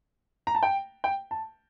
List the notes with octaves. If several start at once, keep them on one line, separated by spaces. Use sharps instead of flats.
A#5
A5
G5
G5
A5